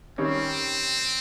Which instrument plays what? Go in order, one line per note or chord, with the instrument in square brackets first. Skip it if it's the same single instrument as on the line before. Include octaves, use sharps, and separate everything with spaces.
[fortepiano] D#3 G3 C#4 [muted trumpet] C4